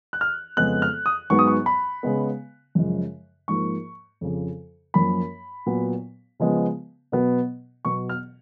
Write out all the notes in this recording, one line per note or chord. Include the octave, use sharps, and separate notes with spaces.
F#6
F6
F2 C#3 G#3 B3 F#6
F6
D#6
G#2 F#3 B3 C#6
D#6
C#6
B5
C#3 G#3 B3
F#2 C#3 F3 G#3
G#2 F3 A#3 C#6
F2 C#3 F3
F#2 F3 A#3 B5
A#2 F#3 B3
C#3 F3 G#3 B3
B2 F#3 B3
B2 F#3 B3 C#6
F6